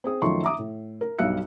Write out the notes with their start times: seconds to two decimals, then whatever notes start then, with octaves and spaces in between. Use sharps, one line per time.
0.04 C4 G#4 D#6
0.22 F#2 D#3 F3 A3 C6 C#6
0.43 E5 A#5 D6 D#6
0.59 A2
1.01 A#4
1.19 B1 G2 F5 E6 F#6 C#7